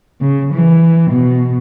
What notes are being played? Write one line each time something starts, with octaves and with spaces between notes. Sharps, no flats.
C#3
E3
B2